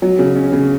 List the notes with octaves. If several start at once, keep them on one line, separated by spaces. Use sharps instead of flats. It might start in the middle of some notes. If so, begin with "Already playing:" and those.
F#3
C#3
C#4
C#3